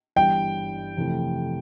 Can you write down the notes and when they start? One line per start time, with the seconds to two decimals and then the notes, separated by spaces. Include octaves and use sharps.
0.16 G1 G2 E3 G3 G5
0.97 F2 C3 E3 A3